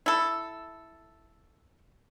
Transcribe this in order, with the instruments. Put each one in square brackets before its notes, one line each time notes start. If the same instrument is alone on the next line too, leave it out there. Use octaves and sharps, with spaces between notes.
[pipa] E4 A4